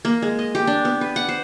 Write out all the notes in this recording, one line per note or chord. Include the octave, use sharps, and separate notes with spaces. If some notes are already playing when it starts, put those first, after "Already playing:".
A#3
G#3
D#5
G4
D4
B3
B4
F#5
C5